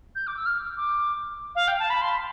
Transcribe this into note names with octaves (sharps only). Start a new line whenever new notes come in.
G6
D6
E6
F6
D6
F5
G5
A5
B5
C6